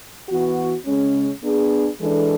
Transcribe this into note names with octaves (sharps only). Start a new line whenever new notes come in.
E3 B3 F#4
C#3 G#3 C#4
B3 D4 G#4
E3 G#3 D4 A4